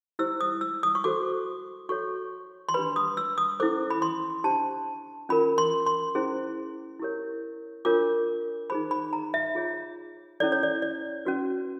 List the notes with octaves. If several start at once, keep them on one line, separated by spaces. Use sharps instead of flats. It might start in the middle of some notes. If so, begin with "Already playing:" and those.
E4 G4 C5 E6
D#6
E6
D#6
C#6
F#4 A4 C5 D6
F#4 A4 C#5 C#6
C6
D4 G4 B4 B5
D#6
E6
D#6
C#4 E4 A4 C5 D6
B5
C6
D4 G4 C5 A5
C#4 F4 A#4 B5
C6
C6
C#4 E4 G#4 C5
E4 G4 A#4 C#5
D4 F4 A#4 C#5 D6
D#4 G#4 C5 B5
B5
A#5
E5
F4 G#4 C#5
C#4 E4 A4 C#5 D5
C#5
D5
D5
C#4 F#4 B4